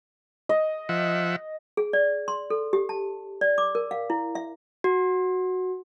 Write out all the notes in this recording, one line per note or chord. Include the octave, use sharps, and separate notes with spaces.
D#5
F3 E5 F#5
G#4
D5
C6
A4
G4
A5
D5
D6
A#4
F5
E4
E5
F#4